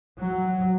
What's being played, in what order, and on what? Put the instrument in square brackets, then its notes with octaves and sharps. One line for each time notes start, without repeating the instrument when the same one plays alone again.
[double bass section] F#3